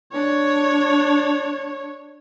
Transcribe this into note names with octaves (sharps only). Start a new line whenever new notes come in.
D4 C#5